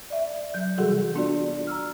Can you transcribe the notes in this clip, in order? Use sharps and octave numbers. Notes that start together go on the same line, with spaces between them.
D5 E5
F#3 G6
C3 E3 G3 F#4 G#4 A4
A#3 B3 D4 F4 F#4 D5
A#5 E6 F6